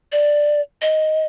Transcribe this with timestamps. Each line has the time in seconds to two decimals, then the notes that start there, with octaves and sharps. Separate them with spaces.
0.12 D5
0.82 D#5